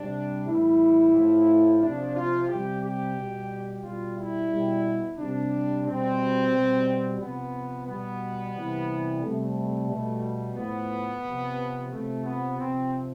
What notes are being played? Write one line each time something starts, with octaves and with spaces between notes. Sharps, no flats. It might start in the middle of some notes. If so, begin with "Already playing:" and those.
Already playing: C3 G3 D4
A2 E3 G3 E4
A2 F3
C3 F3 D4
F4
C3 G3 G4
G4
B2 G3
B2 G3 F4
E4
B2 G3
C3 G3 D4
B2 G3 C4
B2 G3
C3 F3 B3
B2 G3 B3
C3 E3 G3
C3 G3 A3
B2 G3
A2 F3 B3
C3 F3
C3 F3 A3
B3
C3 F3 C4